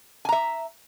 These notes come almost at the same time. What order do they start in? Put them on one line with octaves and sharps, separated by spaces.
G#5 A#5 E5